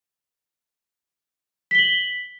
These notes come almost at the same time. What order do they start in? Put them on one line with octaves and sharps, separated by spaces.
B6 G7 F#7